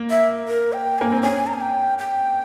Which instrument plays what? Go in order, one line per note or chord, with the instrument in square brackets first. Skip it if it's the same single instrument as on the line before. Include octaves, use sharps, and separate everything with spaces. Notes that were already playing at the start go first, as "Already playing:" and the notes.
Already playing: [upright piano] A#3
[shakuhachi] E5
A#4
G5
[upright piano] A#3 [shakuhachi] G#5
[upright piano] C4
[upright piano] C#4 [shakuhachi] G#5
[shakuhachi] A#5
G#5
G5
G5